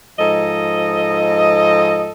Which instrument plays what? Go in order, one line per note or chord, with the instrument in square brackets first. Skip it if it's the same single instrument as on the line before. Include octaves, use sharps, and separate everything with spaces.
[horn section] G#2 F3 A4 D#5